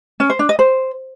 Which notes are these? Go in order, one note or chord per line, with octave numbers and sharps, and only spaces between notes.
C#4
C5
D4
D#5
C5